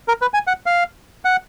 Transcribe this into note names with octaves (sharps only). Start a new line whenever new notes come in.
A#4
B4
G#5
F#5
F5
F#5